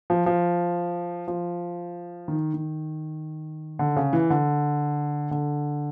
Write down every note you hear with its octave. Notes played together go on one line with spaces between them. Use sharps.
F3
F3
F3
D#3
D#3
D3
C#3
E3
D3
D3